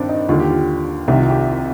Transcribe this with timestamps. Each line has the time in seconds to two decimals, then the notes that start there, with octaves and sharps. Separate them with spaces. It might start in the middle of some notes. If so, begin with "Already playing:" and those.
Already playing: G2 D#3 C4 D4
0.09 D#4
0.29 D#2 D3 F4
0.40 G4
0.50 F4
1.08 C2 C3 D#3 G4
1.19 F4
1.30 G4